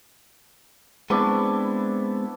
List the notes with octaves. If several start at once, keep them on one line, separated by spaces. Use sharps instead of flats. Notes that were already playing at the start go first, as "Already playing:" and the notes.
G#3 B3 C4 D4 E4 C#6